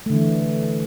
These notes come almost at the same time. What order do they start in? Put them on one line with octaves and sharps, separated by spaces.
A3 D3 E3